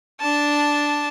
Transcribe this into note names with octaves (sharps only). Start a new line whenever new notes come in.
D4 A5